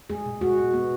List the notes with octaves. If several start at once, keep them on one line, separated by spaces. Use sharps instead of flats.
G#3 G#4
B2
G#3 F#4
B2
B3